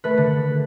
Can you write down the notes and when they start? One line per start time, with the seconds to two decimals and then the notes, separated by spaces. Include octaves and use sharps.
0.04 A3 B4
0.17 D3